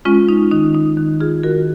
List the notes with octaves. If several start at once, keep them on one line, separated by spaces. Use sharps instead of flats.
G#3 C#4 F4
D#4
D#3 D#4
D#4
D#3
F4 G#4
D#3 F#4 A#4